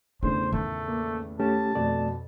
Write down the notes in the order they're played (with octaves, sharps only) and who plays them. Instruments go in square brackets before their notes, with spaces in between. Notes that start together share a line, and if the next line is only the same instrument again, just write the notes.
[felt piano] E2 A2 C#3 [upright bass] D4 [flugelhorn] C5
[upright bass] D#3 [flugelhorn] A3
[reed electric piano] A#3
[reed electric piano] A3 C#4 G4 [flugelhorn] A5
[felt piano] F2 B2 [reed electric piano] A3 D5